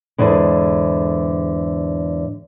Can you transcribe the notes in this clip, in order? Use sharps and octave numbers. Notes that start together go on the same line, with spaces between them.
E2 G#2 D3